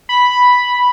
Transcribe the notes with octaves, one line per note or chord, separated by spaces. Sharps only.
B5